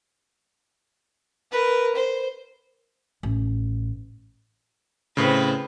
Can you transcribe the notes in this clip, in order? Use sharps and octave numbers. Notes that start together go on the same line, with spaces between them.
A#4 B4
C5
A1
A2 C#3 C4 B4